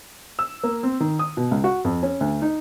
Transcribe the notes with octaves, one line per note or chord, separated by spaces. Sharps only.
E6
A#3
C4
D#3
D#6
B2
C#2
F#4
F2
C#4
D2
D#4